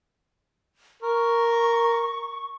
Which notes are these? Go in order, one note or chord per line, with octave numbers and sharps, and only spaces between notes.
A#4 C#6